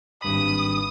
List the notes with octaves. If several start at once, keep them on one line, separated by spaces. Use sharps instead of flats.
G#1 G2 B5 D#6